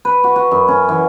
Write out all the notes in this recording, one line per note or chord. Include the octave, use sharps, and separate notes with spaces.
B4
F#4
F#4
F#2
C#4
E3